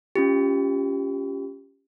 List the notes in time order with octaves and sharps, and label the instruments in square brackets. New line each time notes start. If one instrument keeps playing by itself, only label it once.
[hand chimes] C#4 F4 G4